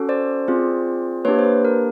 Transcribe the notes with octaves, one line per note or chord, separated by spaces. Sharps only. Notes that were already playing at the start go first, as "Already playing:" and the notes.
Already playing: C#4 F#4 A4
C5 D5
C4 F4 G#4
A#3 D4 G4 B4 C#5
C5
B4
A#4